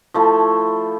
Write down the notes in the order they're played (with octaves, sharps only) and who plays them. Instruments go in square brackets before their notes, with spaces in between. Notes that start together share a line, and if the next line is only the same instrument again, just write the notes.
[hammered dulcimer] F3 A3 E4